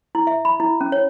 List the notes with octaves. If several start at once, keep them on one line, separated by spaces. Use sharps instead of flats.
E4
E5
B5
E4
C#4
C#5